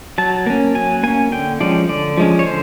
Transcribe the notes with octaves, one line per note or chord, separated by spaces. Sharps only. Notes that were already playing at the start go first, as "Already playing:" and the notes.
F#3 A5
A#3 C#4
F#3 G#5
A#3 C#4 G#5
D3 G5
F3 G#3 C#4 D5
D3 D5
F3 G#3 C#4
C#5
D3 C5